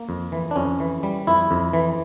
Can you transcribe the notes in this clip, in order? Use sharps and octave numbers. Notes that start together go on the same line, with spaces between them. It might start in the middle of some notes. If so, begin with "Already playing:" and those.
Already playing: A#3
F2
E3
D4
F2 C#4
E3
G3
F2 E4
F2
E3